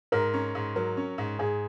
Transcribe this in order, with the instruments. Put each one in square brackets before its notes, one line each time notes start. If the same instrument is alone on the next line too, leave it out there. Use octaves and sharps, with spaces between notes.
[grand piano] G#2 [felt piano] A#4
[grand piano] C#4
G#2
[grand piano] F#3 [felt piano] A#4
[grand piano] C#4
G#2
[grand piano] G#2 [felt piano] G#4